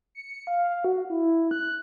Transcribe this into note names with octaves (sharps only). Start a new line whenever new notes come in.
C#7
F5
F#4
E4
F#6